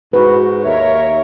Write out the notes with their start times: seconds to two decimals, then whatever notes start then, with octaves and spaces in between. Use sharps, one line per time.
0.13 G#2 F#4 B4
0.64 D#2 A#4 C#5 E5